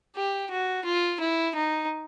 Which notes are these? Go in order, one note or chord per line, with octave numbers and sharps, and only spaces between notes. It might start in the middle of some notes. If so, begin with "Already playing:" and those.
G4
F#4
F4
E4
D#4